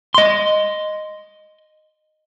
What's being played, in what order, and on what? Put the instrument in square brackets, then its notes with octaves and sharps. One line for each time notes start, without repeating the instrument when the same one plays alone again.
[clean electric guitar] D#5 C6